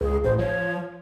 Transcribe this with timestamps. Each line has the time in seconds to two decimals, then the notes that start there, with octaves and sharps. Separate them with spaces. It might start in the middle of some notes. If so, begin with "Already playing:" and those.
0.01 C#2 G#4
0.24 A1 C5
0.39 F3 C#5